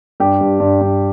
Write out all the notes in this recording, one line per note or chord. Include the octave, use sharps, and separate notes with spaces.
G2 G4
G2
G2
G2